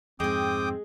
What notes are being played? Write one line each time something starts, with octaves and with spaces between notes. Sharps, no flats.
F2 G#2 G#3 C4 G#4 G5 D6 D#6